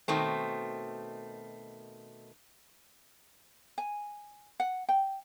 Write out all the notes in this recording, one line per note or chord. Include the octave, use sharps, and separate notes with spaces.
B2 D#3 A3 C4
G#5
F#5
G5